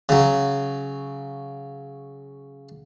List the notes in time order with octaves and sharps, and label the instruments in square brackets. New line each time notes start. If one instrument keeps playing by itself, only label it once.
[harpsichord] C#3 F#3